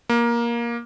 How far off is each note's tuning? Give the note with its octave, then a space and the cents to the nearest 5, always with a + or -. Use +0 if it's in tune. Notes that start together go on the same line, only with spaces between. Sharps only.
A#3 +15